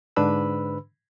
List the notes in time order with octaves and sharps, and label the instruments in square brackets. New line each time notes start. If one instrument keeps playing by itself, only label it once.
[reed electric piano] G#2 D3 D4 B4 B5 E6